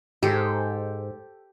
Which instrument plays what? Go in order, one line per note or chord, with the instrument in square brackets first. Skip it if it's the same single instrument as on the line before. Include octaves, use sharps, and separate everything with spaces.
[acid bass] G#2 [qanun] G4 A4 C5